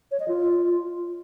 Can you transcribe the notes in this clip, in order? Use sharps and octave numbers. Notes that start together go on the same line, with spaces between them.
C#5
D#5
F4